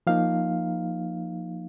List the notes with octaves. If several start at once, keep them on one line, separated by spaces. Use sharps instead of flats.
F3 A#3 D#4 F5